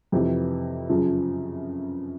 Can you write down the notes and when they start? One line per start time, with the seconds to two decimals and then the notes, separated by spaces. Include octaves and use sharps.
0.12 F2 C3 E3
0.89 F#2 C#3 F3